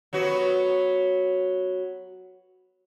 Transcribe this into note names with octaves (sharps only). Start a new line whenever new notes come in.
F#3 B3 F#4